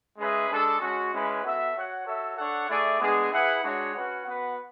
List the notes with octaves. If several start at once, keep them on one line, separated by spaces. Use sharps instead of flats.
G#3 C#4 G#4 B4 E5
G#3 D4 A4
G#3 C#4 F#4
G#3 C#4 E4 B4
B3 F#4 A4 E5
F#4 C#5 F#5
F#4 A4 C#5 E5
D4 A4 C#5 F#5
A3 E4 G#4 D5
G#3 B3 D4 G#4
E4 G#4 B4 F#5
G#3 D4 F#4 C#5 F#5
C#4 F#4 B4 F#5
B3 F#4 B4 F#5